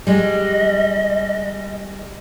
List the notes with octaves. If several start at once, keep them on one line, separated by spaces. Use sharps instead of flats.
G3 G#3 D#5